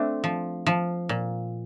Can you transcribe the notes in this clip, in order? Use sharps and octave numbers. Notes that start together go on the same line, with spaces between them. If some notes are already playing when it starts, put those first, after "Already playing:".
Already playing: A3 C4 D4
F3
F3
A#2